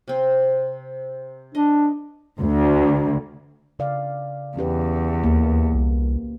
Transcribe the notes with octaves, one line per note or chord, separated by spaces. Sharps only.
C3 C4
D4 D#5
D2
C#3 D5 F5
E2 C#4 G4 B4
D#2 A#3
C2